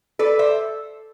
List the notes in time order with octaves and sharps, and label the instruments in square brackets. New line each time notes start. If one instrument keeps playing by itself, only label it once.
[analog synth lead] A4 [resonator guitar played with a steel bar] B4 D5
[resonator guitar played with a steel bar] C5 E5